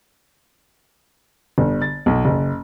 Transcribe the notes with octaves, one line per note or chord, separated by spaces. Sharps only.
G1
A6
B1
F#1